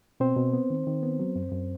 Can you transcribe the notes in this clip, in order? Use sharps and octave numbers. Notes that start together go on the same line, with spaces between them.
B2 C4 C5
B2
B3
D#3
D#3
B3
F#3
F#2
F#2